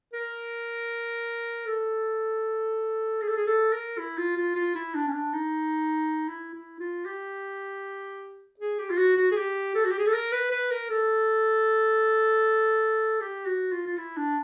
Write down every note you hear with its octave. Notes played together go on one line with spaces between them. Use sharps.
A#4
A4
G#4
A4
G#4
A4
A#4
E4
F4
F4
F4
E4
D4
C#4
D4
D#4
E4
E4
F4
G4
G#4
G4
F4
F#4
F#4
G#4
G4
A4
F#4
G4
G#4
A4
A#4
B4
B4
A#4
A4
G4
F#4
F4
F4
E4
D4